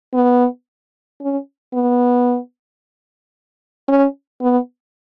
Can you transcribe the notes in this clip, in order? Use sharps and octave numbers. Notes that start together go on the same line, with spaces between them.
B3
C#4
B3
C#4
B3